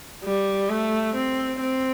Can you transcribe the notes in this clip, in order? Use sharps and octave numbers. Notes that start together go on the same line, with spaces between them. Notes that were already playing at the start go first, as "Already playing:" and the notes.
G3
A3
C4
C4